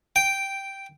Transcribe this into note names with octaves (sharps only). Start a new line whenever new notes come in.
G5